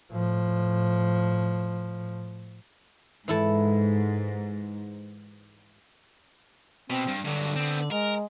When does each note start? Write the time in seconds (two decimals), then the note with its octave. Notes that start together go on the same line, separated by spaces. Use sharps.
0.12 A2 F3
3.28 G#2 E3 E4 A4
6.90 B2 C4
7.08 G2
7.25 G2 D3 F#3
7.56 B3 C4
7.91 G#3 A#4